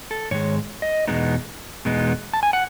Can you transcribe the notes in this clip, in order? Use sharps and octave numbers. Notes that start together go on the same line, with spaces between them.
A4
G#2 D#3 G#3 C#5
D#5
E2 B2 G#3 B3 D#4
E2 B2 G#3 B3 D#4
A5
G#5
F#5